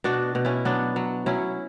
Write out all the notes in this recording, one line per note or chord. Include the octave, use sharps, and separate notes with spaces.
B2 D4 F#4
B2
C#4 E4
F#3 B3 D4
F#3
F#3 C#4 E4